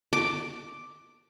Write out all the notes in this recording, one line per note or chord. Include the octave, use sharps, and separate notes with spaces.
D6